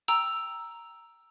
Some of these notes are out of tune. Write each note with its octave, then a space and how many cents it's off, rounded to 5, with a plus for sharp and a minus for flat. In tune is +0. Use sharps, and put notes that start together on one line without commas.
G5 +5 A#5 +0 E6 +0